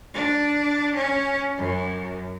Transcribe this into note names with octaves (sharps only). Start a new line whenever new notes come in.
D4
C#4
F#2